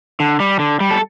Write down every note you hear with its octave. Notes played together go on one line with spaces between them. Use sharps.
D3
G3
D3
G3
A4